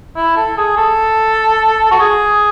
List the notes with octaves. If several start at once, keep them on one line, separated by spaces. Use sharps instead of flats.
E4
A4
G#4
A4
F#4
G#4